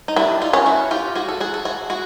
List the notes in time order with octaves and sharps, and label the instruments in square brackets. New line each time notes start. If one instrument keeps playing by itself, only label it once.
[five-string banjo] D#4
[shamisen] G3 [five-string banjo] D4 E4
[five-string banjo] D#4 F4
[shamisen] C#4 [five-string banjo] F4
[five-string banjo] E4 F#4
F4 G4
F#4 G#4
A4
F#4 G#4
A4
F#4 G#4
F#4 G#4